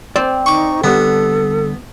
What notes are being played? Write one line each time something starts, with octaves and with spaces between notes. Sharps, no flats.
C4 C5 D5
D#4 C#6 D6
D3 G3 B3 D4 A4